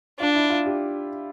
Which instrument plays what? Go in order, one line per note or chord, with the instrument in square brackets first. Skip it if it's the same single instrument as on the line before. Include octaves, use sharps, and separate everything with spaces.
[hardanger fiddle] D4 [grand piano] F4
[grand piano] E4
F4
G4